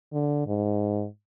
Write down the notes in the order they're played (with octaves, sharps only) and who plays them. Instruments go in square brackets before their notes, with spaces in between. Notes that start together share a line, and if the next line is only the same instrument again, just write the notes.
[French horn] D3
G#2